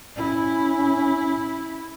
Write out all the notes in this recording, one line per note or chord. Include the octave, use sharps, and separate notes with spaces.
C#4 E4